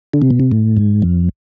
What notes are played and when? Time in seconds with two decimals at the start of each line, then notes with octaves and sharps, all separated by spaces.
0.14 D3
0.22 C3
0.30 B2
0.40 C3
0.51 A2
0.77 G#2
1.02 F2